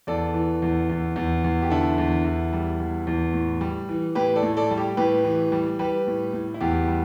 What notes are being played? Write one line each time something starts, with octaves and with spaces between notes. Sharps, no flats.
E2 A4 D5
E3
E2
E2
E2
E2
G4
D3 E4 A4
E2
E2
G3
E2
E2
A2
G3
E3
A2 G4 B4
A4 D5
A2
A4 D5
G3
G4
A2 G4 B4
E3
G3
G3 G4 B4
A2
A2
E4
E2 G4
G3